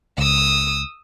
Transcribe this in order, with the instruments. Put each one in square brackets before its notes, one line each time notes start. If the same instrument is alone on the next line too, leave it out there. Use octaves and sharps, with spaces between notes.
[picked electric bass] C#2 [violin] D#6 E6